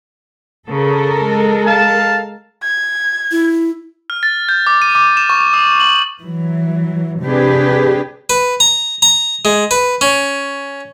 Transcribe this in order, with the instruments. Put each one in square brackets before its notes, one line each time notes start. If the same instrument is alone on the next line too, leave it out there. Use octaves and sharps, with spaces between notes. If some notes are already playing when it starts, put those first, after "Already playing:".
[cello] C#3 [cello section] A4 A#4
[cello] G#3
[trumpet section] F5 A5
[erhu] G#6
[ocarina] E4
[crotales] F6
A6
G6
D6
D#7
D6
E7
C#6
D#6
F#7
[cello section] E3 F#3
C3 D4 G4 G#4 B4
[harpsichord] B4
A#5
A#5
G#3
B4
C#4